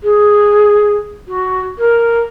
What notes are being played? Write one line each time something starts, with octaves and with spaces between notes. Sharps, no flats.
G#4
F#4
A#4